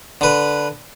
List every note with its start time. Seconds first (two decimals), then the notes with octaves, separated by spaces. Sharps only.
0.21 D3 B4